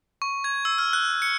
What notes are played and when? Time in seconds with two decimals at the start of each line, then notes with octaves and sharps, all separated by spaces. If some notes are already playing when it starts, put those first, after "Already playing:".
0.22 C#6
0.44 G#6
0.65 E6
0.78 F6
0.93 F#6
1.22 C#7